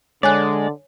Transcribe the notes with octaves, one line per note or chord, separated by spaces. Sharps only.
D3 G#3 C#5 D5 G#5 F#6